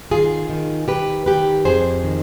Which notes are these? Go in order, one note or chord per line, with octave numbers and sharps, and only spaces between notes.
D#3 F4 G#4
D#3
D#3 G4 B4
D#3 G4 B4
F2 G#4 C5
D#3